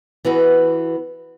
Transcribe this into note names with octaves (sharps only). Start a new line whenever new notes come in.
E3 B3 F#4 G#4 B4